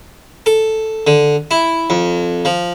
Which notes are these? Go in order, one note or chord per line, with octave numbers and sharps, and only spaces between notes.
A4
D3
E4
F2
F3